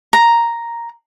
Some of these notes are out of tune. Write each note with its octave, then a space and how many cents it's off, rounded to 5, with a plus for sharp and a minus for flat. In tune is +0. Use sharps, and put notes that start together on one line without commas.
A#5 +0